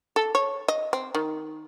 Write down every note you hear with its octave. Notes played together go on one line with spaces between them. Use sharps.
A4
C#5
D#5
C4
D#3